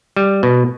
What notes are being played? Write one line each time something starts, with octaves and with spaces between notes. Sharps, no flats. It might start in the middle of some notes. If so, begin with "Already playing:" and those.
G3
B2